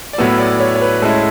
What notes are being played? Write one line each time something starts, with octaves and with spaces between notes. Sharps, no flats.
D5
A2 F#3 B3 E4 E5
D5
C#5
C#5
B4
A2 G#3 C#4 E4 A4